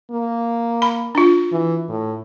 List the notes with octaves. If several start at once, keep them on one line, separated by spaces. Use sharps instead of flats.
A#3
B5
D4 F4
E3
A2